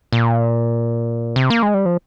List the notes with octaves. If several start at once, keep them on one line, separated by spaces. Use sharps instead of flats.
A#2
C3
A#3
G#3
G3
F3